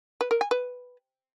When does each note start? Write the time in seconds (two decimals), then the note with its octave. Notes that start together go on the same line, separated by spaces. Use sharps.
0.21 B4
0.31 A#4
0.41 G#5
0.51 B4